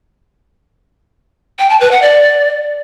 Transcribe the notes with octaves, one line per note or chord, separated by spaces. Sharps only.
G5
A5
B4
F#5
D5